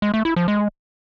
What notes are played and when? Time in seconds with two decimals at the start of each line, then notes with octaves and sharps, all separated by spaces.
0.02 G#3
0.14 A3
0.25 E4
0.36 F3
0.48 G#3